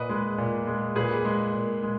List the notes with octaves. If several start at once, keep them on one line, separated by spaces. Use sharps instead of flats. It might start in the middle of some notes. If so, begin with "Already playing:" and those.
Already playing: A#2 B4 D#5
G#3
A#2
G#3
A#2 G#4 B4
G#3
A#2
G#3